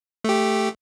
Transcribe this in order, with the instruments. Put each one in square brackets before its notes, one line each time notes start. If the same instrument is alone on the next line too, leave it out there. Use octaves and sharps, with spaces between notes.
[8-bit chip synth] A3 G4